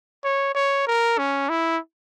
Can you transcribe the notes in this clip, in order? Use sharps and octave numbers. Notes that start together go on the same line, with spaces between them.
C#5
C#5
A#4
C#4
E4